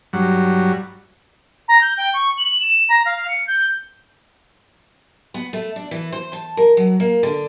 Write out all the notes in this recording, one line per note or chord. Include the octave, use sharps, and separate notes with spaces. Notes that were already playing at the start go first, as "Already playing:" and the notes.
G2 F#3
A#5
G6
G5
C#6
F#7
E7
A#5
F5
C#7
G6
B3
A3
D4
E3
C5
A5
A#4
F#3
A#3
D3